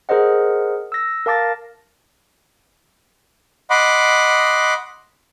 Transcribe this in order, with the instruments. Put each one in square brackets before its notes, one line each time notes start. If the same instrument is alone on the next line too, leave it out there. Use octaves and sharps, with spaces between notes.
[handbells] G#4 A#4 C5 D#5 F#5
E6 A#6
A#4 F5 A5 D6 A6 A#6
[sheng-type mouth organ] D#5 F#5 B5 C6 D6